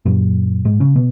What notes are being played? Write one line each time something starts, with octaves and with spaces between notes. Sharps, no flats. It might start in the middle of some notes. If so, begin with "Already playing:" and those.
F#2 A#2 F#3
G#2 G#3
C#3 C#4
B2 B3